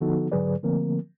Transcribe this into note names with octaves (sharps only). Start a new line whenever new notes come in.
D3 F3 B3 D#4 F#4 A4
G#2 D3 F#3 G#4 B4 D5
D3 F3 A3 A#3 C4 A#4